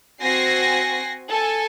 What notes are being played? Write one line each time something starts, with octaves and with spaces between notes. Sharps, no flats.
C4 F#4 G#5 A#6 C7
A4 G#5